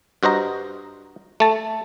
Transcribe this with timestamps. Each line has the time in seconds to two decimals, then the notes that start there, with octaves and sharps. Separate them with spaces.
0.23 G2 F#4 C5 D#5 A#5
1.40 A3 A5